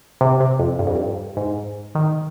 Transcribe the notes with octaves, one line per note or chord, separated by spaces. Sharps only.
C3
C3
F2
G2
F2
G2
G#2
D#3